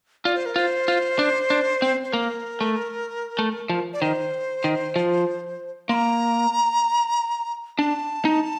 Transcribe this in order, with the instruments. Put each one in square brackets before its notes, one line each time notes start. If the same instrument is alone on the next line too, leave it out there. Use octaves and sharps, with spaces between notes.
[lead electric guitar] F4 [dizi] D5
[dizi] C5
A#4
[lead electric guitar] F4 [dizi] C5
[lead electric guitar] F4
D4
D4
C4
[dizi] C5
[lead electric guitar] A#3 [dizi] A#4
[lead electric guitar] A3
A3
F3
[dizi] D5
[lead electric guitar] D#3 [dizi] C5
[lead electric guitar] D#3
F3
[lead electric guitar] A#3 [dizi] A#5 C6
[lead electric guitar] D4 [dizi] A5
[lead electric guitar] D#4